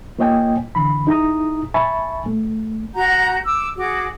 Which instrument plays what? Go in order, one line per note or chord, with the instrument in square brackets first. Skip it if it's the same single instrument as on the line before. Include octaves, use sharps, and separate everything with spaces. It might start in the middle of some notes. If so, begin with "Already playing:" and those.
[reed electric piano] A#3 F4 C#5 D#5 G5 G#5
D3 E3 B5
D#4 E4 G#4 A#5 D#6
E5 G#5 A5 B5 C#6 A6
A3
[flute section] F#4 F#5 A#5 G6
D6 E6
F#4 G#4 D6